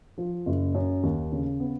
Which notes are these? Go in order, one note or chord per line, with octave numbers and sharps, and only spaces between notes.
F3
F#1
F#2
D#2
C#3
B3